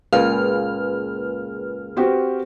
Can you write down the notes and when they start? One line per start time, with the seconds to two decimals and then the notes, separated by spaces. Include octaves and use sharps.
0.13 C#2 A#2 G#4 B4 F5 F6
1.97 C4 F#4 G4